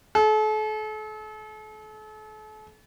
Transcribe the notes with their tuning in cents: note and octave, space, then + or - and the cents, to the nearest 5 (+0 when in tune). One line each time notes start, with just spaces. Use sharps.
A4 -40